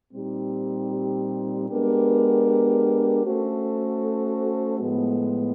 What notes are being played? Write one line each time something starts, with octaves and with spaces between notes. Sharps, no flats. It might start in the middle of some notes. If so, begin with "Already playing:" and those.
A#2 G3 C4 D#4 G4
G#3 B3 D4 G4 A#4
A3 C#4 F#4 A4 C5
A2 F3 G#3 B3